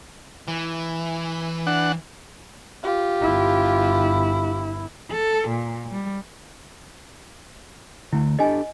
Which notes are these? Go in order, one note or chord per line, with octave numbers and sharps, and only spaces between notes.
E3
D4 F#5
F4 G4
G1 E4
A4
A#2
G3
D3 A3 E4
D4 G4 A4 D#5 G#5